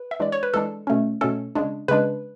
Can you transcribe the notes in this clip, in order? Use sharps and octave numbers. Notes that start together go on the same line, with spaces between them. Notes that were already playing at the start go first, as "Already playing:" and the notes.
Already playing: B4
E5
E3 G#3 D4 D5
C#5
B4
E3 G#3 D4 A4
B2 A3 C#4
B2 A3 C#4 A4
C#3 G#3 D4
C#3 G#3 D4 B4